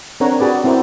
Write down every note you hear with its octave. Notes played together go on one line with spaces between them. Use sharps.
C4 D4 A#4 C#5 F#5 A#5
F#4 G#4 B4 D5
C4 E4 F#4 A#4 C5 D5